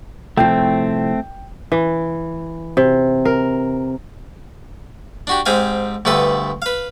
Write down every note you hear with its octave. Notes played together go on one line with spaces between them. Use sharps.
C2 A2 F3 A3 C4 G5
E3
C3
A#4
D4 F#4 G4
G#2 C4 G4 F5 G#5
D2 G2 B3 A4 B4
B4 F5